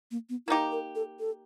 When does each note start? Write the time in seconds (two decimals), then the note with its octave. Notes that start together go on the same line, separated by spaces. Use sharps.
0.11 A#3
0.29 B3
0.47 A#3 D#4 E4 G4
0.72 A#4
0.95 A4
1.19 A4